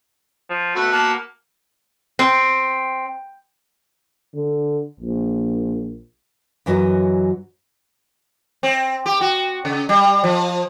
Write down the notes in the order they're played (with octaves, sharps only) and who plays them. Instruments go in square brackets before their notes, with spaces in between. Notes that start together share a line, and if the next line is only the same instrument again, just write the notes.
[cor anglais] F3
[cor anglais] A3 [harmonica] F#4 F#5 B5
[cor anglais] A#3 [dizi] A5
[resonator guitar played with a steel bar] C4
[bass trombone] D3
A#1
[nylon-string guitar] F#2 E3 F#3 F#4 D#5
[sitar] C4
G4
F#4
C#3
G3
F3